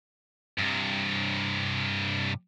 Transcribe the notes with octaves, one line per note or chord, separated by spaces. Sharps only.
G2 C3